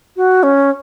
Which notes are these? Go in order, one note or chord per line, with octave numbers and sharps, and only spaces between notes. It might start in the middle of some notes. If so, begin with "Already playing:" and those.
F#4
C#4